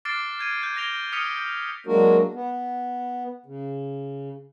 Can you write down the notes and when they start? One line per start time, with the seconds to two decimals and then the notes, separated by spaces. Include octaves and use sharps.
0.05 D6 F6 F#6 A6 C7 D7
0.39 G6 G#6 D#7
0.59 G6 C7
0.76 G#6 A#6 D7 F7 G7
1.12 D#6 F6 B6 C#7 D#7 F7
1.37 G6
1.87 F#3 G#3 A#3 D4 F#4 A#4
2.34 B3
3.46 C#3